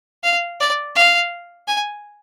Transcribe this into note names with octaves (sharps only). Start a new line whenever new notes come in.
F5
D5
F5
G#5